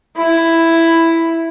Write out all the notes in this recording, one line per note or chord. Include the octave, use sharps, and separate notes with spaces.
E4